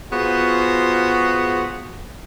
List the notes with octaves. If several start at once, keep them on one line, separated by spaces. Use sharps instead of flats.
B3 F4 F#4 G#4 C5